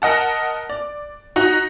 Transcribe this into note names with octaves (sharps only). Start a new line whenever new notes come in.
A#4 D#5 F#5 A5
D5
D#4 F#4